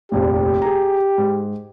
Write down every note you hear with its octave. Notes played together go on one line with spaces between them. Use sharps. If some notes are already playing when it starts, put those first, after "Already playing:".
F1 A#1 D#2 G4
G#4 A#5
G#2